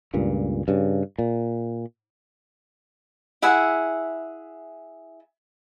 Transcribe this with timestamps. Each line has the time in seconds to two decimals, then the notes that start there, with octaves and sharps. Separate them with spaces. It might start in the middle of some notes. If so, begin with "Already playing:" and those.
0.14 C#2 G2 A#2
0.68 G2 C#3
1.19 A#2
3.42 E4 G#4 E5 F#5